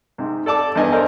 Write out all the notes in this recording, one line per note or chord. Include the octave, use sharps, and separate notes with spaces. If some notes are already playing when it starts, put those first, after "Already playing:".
G#2 C3
A4 D5 A5 D6
E2 G2 D#5 G#5
A4 A#4 C5 D5 D#5 G#5